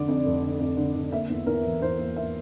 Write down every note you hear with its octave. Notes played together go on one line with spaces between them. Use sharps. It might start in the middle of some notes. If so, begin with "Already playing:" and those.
Already playing: F1 D3 D5
F2
F1
D3
F2
D3
D3
A#3 E5
E2
E2 A#4
E3
E2 C5
A#3
A#3 E5